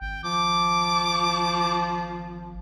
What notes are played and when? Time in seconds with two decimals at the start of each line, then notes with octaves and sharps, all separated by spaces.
0.01 G#1 G5
0.24 F3 D6